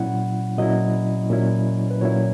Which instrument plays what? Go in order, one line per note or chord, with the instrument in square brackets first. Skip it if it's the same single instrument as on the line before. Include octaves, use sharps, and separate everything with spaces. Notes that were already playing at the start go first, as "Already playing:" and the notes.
Already playing: [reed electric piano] A#2 F#3 C#4 E4 F#5
A#2 F#3 C#4 E4 D#5
A#2 F#3 C#4 E4
B4
A#2 F#3 C#4 E4 C#5